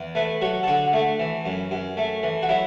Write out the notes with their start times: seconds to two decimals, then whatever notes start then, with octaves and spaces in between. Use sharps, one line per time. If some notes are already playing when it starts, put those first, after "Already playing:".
Already playing: E2
0.15 A3 B4
0.41 F#3 F#4
0.63 A4
0.67 D3 F#4
0.93 A3
1.19 E3
1.45 F#2
1.71 F#2
1.97 A3
2.23 E3
2.43 F#4
2.49 F#3 E4